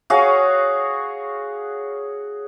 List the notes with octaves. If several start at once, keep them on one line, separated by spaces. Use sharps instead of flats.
F#4 G#4 C#5 F5